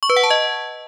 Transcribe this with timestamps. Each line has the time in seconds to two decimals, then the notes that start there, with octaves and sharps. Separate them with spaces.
0.03 C#6
0.10 B4
0.17 F#5
0.23 A5
0.30 D#5